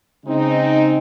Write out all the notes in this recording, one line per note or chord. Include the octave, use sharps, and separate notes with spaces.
C#3 G#3 C4 D#4